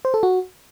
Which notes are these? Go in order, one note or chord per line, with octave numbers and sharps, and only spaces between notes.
C5
A4
F#4